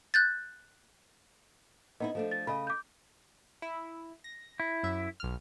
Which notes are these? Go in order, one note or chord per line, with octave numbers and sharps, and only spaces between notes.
F#6 G6 A6
B3 D#4 E4 D#5
F3 A3 D4
A6
C#3 D#5 B5
D6 G6
E4
A#6
E4
F#2 E5
B1 F6